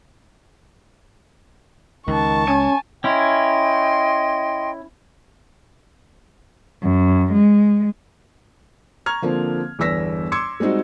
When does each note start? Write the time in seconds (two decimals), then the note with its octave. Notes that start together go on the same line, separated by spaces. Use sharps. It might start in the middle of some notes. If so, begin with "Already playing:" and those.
2.07 C#2 D#3 A5 C#6
2.48 C#4 G#5
3.04 C#4 E4 D#5 G5 C6
6.83 F#2
7.33 G#3
9.06 A#5 C#6 F6 G#6
9.22 D3 F3 A#3 C4
9.79 G1 E2 B3 E6 A#6 B6
10.32 C6 D6 E6 G#6 C#7
10.60 G3 G#3 C4 D#4 F#4